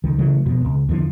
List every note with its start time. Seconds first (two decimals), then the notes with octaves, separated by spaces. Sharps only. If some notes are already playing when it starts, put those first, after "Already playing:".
0.04 C#2 D#3
0.18 C#3 E3 F#3 A3
0.46 E1 F2 B2
0.65 C#2
0.89 E2 D3 F3